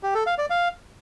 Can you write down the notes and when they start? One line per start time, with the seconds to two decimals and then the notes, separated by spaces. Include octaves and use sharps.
0.03 G4
0.15 A4
0.26 F5
0.38 D5
0.50 F5